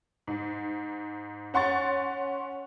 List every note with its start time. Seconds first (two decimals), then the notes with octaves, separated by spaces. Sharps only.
0.27 G#2
1.54 C#4 F#5 C6 C#6 A6